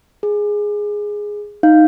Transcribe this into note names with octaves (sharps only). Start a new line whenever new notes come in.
G#4
D#4 F5 G6